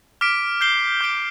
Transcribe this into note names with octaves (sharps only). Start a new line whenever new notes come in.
D6 F6 B6 D7
G6 C7 G7
D6 G6 D7 G7